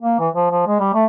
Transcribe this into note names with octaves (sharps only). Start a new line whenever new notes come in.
A#3
E3
F3
F3
G#3
G3
A3